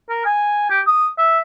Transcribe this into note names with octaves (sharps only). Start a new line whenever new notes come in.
A#4
G#5
G4
D#6
E5